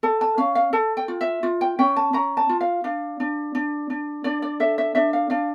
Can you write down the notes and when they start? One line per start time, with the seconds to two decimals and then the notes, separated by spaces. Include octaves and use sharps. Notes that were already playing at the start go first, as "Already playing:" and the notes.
0.03 A4 A5
0.21 A5
0.38 C#4 F5
0.55 F5
0.73 A4 A5
0.97 G5
1.08 F4
1.21 E5
1.43 F4
1.61 G5
1.79 C#4 G5
1.97 A5
2.13 C#4 A#5
2.37 A5
2.49 F4
2.61 F5
2.84 D4 F5
3.20 D4
3.55 D4
3.90 D4
4.24 D4 D5
4.42 D5
4.60 A4 E5
4.78 E5
4.95 D4 E5
5.13 F5
5.30 D4 F5